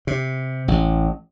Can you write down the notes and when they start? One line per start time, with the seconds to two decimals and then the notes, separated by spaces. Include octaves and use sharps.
0.07 C3
0.68 A1